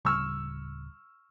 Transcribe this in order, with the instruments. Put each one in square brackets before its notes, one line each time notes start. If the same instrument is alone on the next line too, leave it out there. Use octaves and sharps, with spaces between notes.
[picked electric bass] D1 C#3 G3 [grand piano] C#6 E6 F6